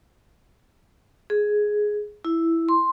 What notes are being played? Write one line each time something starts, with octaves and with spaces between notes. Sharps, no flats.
G#4
E4
C6